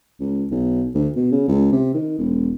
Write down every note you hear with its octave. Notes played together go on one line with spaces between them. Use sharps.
C#2
B1
D2
B2
C#3
C#2
C3
D#3
E1